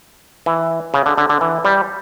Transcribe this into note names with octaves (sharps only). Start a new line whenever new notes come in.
E3
C#3
D3
D3
D3
E3
G3